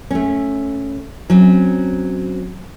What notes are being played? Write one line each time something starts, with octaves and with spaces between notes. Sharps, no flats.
A3 C#4
F#3 C4 C#4